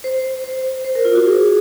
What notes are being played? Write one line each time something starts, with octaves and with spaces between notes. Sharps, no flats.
C5
C5
C5
A#4
F4
F#4
G#4